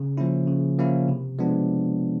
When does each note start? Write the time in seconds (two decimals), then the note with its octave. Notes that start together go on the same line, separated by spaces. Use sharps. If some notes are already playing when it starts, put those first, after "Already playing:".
Already playing: C#3
0.18 F3 A#3 C#4 E4
0.47 C#3
0.79 F3 A#3 C#4 E4
1.08 C3
1.39 F3 G#3 B3 D4